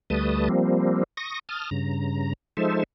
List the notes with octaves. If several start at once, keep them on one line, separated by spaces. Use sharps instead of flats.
D2 G3 A3 B4 A5 D#6
F3 G3 A#3 C4
C#6 D#6 A#6
A5 D#6 F6
G2 C#3 A#5
F3 G#3 D#4 A4 C5 E5